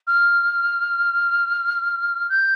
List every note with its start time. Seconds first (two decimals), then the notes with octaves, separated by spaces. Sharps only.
0.07 F6
2.29 G6